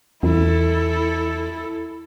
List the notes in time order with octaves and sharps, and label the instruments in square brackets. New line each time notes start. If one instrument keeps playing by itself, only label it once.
[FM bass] E2 [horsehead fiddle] E4 A4